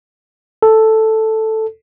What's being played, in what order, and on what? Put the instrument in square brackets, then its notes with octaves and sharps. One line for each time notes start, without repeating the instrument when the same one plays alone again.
[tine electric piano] A4